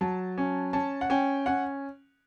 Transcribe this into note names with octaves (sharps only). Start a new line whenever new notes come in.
F#3 A5
C#4
C#4 A5
F#5
C#4 G5
C#4 F#5